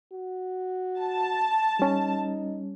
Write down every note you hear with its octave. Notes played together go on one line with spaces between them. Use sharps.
F#4
A5
G3 C#4 D#4